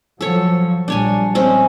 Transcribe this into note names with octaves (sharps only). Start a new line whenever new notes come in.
F3 F#3 A4 C#5
A#1 G3 D4 C#5 G#5
G#3 C4 C#4